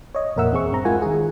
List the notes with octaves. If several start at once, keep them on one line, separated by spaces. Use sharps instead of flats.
C#5 D#5
F2 A#2 A#4 E5 F#5 E6
E2 C4 G#4 C#6
G2 C4 A#5
G#3 E4 F4 A#4 F#5 G#5
D#3 G#4